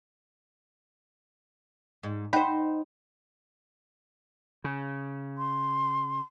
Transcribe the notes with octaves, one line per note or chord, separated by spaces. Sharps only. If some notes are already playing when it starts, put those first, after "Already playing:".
G#2
D#4 C5 F#5 G5 B5
C#3
C6